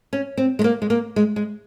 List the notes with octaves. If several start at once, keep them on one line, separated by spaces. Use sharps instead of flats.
C#4
C4
G#3
A#3
G#3
A#3
G#3
G#3